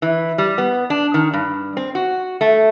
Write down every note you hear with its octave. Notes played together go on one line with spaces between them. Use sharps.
E3
G3
B3
D4
D#3
G2
C4
F#4
A3